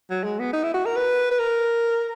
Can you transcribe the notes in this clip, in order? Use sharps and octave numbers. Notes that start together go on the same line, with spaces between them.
F#3
G#3
B3
D#4
E4
F#4
A#4
B4
B4
A#4